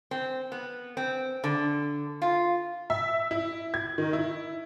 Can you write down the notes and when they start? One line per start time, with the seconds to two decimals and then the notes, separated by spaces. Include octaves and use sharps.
0.11 C4
0.52 B3
0.97 C4
1.44 D3
2.22 F4
2.90 E5
3.31 E4
3.74 G#6
3.98 D#3
4.13 E4